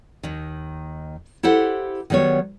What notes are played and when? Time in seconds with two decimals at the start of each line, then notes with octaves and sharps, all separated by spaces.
0.23 D#2 D#3
1.43 E4 G4 A4 C5 F#5
2.10 D#3 F#3 G3 B3 C#5